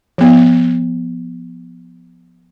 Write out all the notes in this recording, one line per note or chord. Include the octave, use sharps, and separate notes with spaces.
F3 B3